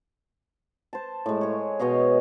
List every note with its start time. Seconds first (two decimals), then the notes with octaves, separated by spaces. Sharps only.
0.93 C5 A5
1.26 A2 G#3
1.41 G#4 C#5
1.79 B2 C#5 D#5 F5